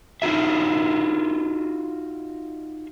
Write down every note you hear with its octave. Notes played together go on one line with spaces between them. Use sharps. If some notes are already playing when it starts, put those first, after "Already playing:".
D#4 F4 F#4 E5